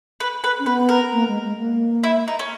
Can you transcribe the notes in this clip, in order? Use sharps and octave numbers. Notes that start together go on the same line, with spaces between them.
B4
B4
C#4
B3 B4
A#4
A#3
G#3
G#3
A#3
E4
D#4
C#4